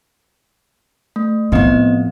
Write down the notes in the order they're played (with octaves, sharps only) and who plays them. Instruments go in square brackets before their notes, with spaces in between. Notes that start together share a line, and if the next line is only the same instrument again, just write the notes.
[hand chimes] A3
[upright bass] A2 F3 [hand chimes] B3 C4 D#5